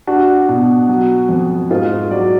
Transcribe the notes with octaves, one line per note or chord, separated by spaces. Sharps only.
D4 F#4
B2
F#3
F2
G#2 F4
F#3 D5